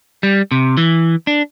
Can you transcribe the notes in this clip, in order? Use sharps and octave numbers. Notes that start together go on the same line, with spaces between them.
G3
C3
E3
D4